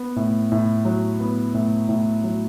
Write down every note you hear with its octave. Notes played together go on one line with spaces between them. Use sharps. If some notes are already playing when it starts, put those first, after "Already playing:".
Already playing: B3
A2
A2
F#3
B3
A2
A2
F#3